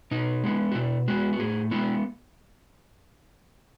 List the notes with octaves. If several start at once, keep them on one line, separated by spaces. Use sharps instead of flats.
B2 D#4
G#3 B3
F#4
B2 E4
G#3 B3 F#4
F#4
A2 G#4
G#3 B3 E4